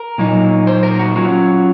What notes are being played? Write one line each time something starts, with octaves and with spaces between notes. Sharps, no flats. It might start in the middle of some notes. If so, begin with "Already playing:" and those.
Already playing: A#4
A#2 F#3 A#3 D#4
C5
A#4
F#4
F#3 C#4 F4 F#4